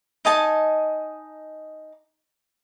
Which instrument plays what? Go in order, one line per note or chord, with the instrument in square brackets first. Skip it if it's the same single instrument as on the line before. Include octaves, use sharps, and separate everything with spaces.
[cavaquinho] D#4 D#5 G#5 A5